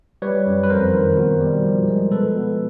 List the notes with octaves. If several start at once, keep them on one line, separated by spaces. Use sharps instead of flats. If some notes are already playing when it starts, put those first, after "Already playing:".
G3 B4 C#5
F#2
B4
F2 A#4 C5
D#3
B2
G3
F3
G#3
B2 A4 B4
B2